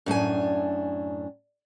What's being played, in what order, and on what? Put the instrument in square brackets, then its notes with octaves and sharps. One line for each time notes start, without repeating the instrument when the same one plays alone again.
[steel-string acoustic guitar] F#2 A2 D4 G#5